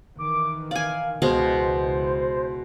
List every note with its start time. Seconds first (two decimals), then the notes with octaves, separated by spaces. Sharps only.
0.19 D#3 E3 D6
0.71 D5 F5 G#5
1.22 C#2 B2 E3 G#3 C5 F5